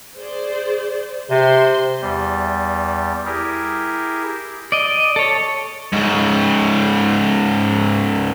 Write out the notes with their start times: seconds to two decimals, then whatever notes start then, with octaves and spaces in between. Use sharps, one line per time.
0.18 G#4 C5 D5
1.30 C3 C5 C6
2.01 E2 G3
3.26 E4 G4 G#4 A#4
4.72 D5 D#5
5.16 A4 C#5
5.93 G#2 C#3